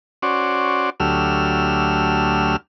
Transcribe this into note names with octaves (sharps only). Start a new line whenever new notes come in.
C#4 F#4 C5 D5
D2 F#3 A3 G4 E6 F6